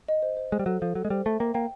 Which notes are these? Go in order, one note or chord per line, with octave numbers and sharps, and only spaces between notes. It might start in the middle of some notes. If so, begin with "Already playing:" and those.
D#5
C5
C5
G#3 C5
G3
F#3 A4
F3 A4
F#3 A4
G#3
G3 C5
A3 E5
A#3 G5
A#3 G5